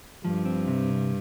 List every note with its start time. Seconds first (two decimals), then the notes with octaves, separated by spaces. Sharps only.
0.24 G2 F3
0.45 C4
0.68 C3
0.89 C2